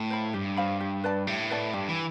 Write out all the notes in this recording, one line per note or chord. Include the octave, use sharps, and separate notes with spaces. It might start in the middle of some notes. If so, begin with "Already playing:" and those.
Already playing: A2
C5 F5 B5
G2 G4
C5 F5 B5
G4
B4 D5 A5
A2 G4
B4 D5 A5
G2 G4
E3